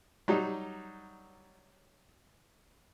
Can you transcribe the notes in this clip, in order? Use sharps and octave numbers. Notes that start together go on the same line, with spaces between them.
F#3 G3 D#4